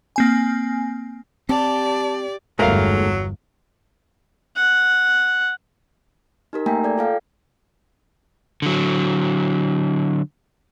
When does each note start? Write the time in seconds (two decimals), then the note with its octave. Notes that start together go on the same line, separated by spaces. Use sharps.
0.16 A#3 C4 G#5
1.49 C4 G4 D5 A5
2.59 G1 E2 G#2 F#3 G#3 A3 A#4 F5
4.56 F#5
6.53 D#4 G4 A#4
6.66 A3 A#3 E5 G5 G#5 A#5
6.84 A4 D5 G#6
6.98 F4 A4 F5 G5
8.62 D3 F#3